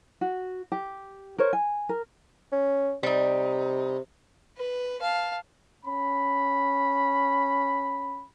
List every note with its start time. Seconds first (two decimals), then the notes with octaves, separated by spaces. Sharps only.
0.21 F#4
0.72 G4
1.38 A#4 C5 C#5
1.53 G#5
1.89 A#4
2.52 C#4
3.03 C3 G3 D#4
4.58 B4
5.01 F5 A5
5.84 C#4 B5